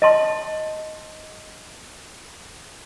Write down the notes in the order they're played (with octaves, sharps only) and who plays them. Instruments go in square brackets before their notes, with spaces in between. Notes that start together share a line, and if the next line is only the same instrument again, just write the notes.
[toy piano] D#5 A5 C6